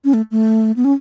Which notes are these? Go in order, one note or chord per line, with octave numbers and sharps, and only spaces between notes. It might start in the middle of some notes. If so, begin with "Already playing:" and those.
C#4
A3
A3
B3
C#4